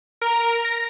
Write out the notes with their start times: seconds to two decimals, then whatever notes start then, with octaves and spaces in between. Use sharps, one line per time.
0.21 A#4
0.65 A#6